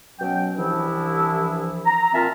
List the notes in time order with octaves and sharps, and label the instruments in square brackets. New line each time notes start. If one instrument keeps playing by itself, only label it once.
[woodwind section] B2 F#3 C#4 G5
C2 E3 F3 D4 E4
A#5
A#2 C4 F4 E5 A5 F6